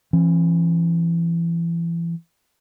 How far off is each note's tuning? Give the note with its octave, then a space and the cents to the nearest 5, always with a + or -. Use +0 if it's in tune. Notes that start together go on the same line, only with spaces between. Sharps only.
E3 +30 C#4 -35